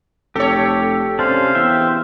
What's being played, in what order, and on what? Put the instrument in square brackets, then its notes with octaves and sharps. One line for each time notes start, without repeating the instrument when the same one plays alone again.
[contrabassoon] F1 [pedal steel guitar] G4 [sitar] A4 C#5
[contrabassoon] C3 [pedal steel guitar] C#4 D4 [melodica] C5 F5
[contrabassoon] E2 [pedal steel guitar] E5 G5